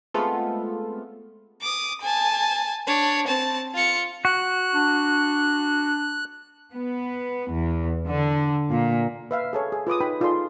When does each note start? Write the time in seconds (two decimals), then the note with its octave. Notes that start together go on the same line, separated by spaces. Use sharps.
0.14 G#3 A3 B3 C4 F4 A4
1.61 D6 D#6
2.01 G#5 A5
2.87 D4 C#5
3.27 C4 A5
3.74 F4 C#7
4.25 F#4 F#6
4.75 D4
6.73 B3
7.52 E2
8.09 D3
8.71 A#2
9.31 B4 E5 F5
9.53 G#4 A4 C#5
9.72 G#4
9.87 F4 B4 D6 D#6
10.00 D#4 B4 G5 B5
10.20 D#4 F4 G#4 A4 D5 C6